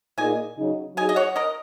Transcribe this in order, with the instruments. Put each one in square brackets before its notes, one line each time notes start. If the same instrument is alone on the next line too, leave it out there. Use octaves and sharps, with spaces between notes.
[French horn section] A#2 A#3 D#4 G#4 [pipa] D#5 G#5
[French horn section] C#3 F#3 D#4
[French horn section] F#3 D#4 G#4 [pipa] D#5 G#5
[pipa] D#5
C#5 F#5
A#4 D#5